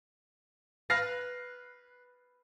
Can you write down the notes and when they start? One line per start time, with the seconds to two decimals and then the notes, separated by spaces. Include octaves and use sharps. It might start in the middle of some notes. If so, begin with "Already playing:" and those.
0.90 B4 F6 A#6 C7